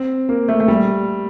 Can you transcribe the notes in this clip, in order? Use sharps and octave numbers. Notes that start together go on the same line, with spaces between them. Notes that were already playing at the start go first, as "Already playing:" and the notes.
Already playing: C4
A#3
A3
A3
G3